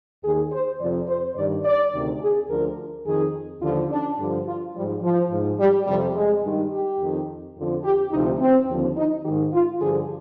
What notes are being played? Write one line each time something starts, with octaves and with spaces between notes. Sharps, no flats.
D#2 D#3 G#4
C5
F2 C3 F3 D5
C5
G2 D#3 D5
D5
D2 C3 D#3
G#4
D2 D3 F3 A#4
F2 D#3 G#4
D#2 D3 F3 F4
D4
G2 D3 F3
F4
G#2 F3 G3
F3
G#2 F3
G3
F2 C3 F3 G3
G#3
G2 D#3
G4
F2 D#3
F2 D3 F3
G4
D2 C3 F3 D#4
C4
D#2 D3 F3
D#4
G#2 D#3 G4
F4
G2 D3 F3 G#4